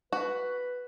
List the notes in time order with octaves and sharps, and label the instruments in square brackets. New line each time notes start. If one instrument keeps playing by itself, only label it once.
[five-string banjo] F#4 [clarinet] B4